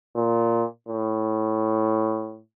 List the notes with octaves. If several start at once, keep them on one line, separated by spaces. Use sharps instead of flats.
A#2
A2